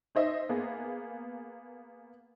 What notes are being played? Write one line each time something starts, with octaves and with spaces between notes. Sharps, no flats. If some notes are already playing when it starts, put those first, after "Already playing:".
D#4 C5 D#5 E5
A#3 B3 G#4